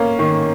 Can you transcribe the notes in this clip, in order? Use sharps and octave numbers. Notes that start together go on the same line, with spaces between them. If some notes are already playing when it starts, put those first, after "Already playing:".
Already playing: A#3 C#4
D#3